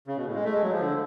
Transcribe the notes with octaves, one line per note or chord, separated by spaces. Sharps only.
C#3
B2
A2
G#3
A3
G#3
F#3
F3
D3